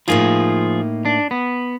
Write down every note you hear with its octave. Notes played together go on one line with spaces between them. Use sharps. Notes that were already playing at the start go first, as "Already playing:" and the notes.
A2 F3 A#3 D#4 F4 G#4
D4
B3